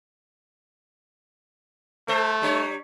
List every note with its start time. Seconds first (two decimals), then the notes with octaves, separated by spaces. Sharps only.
2.08 A3 A4 C5
2.42 G3 D4 C#5